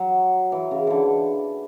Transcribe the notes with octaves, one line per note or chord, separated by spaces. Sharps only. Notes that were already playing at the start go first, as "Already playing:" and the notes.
Already playing: F#3
E3
C#3
D3 E3